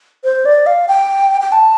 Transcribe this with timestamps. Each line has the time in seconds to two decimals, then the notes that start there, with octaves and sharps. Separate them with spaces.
0.24 C5
0.45 D5
0.66 F5
0.88 G5
1.41 G5
1.52 A5